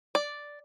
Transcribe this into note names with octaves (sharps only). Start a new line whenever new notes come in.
D5